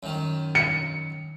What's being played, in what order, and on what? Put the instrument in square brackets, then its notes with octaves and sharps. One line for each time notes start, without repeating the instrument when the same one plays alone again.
[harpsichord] F#2 D#3
[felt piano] C#7